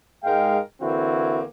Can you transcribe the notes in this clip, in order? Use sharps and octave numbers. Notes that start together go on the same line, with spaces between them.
G#2 G#3 A#4 F5 G5
D3 E3 A#3 C4 E4 F#4